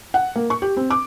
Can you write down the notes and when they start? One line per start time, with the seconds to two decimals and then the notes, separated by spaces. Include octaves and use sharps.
0.14 F#5
0.36 A#3
0.50 C#6
0.62 G4
0.77 C4
0.91 D6